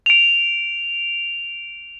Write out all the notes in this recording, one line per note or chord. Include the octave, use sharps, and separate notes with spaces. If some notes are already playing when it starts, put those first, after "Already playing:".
D7 F7